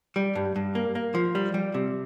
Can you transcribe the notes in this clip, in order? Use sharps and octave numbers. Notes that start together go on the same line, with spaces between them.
G3
G2
G2
A#3
A#3
F3
G3
G3
C3